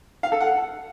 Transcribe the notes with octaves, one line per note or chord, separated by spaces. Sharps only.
F5
A4
F#5